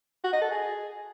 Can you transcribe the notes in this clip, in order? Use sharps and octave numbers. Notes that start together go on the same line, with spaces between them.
F#4
D#5
A4
G#4